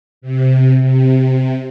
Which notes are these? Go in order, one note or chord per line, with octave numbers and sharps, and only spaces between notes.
C3
C3